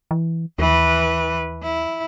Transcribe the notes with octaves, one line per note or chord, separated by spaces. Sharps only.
E3
D#2 E3 B4
E4